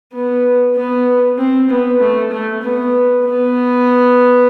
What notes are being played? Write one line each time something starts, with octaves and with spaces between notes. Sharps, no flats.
B3
B3
C4
B3
A3
A3
B3
B3